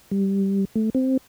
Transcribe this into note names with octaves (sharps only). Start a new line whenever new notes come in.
G3
A3
C4